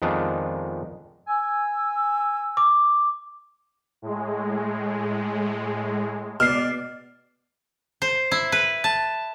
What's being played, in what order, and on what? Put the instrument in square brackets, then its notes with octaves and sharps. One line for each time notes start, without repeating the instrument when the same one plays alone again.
[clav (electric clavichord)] F2 D#3 G#3 B3 D4
[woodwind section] G#5 E6
[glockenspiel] D6
[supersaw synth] A2 G#3
[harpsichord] B2 [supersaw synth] D5 [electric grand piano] F6 C7
[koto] C5
E4
B4
A5